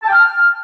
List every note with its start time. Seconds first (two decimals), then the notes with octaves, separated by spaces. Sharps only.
0.03 A5
0.08 G5
0.13 F6